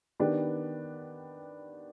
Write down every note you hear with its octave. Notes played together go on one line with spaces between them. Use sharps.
D#3 B3 D4 G4